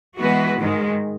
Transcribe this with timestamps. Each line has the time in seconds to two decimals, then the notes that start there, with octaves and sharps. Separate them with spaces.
0.18 E3 G#3 B3 F#4 B4
0.59 G#2 D#3 G#3